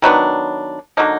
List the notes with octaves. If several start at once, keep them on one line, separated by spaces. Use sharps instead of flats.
D#3 F#3 B3 D4
D3 F#3 A#3 D#4